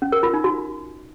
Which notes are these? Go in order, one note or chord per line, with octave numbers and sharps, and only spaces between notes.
C#4
A#4
F4
D#4
F#4